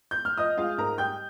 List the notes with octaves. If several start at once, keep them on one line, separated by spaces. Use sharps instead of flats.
G6
F6
F3 D#5 D#6
G#3 F4 F5
G#2 A#4 A#5
G3 G5 G6